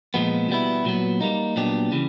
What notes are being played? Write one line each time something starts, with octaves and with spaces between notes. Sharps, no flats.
A#2 F3 G#3 B3
B2 G3 B3 E4
A#2 F#3 B3
G3 A#3 D#4
A#2 F#3 B3 D4 G4
C#3 E3 G3